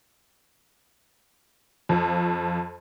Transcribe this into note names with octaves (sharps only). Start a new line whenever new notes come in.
F2 F3